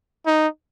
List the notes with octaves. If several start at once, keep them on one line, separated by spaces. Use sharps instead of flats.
D#4